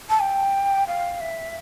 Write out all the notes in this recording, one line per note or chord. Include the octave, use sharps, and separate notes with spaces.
A5
G5
F5
E5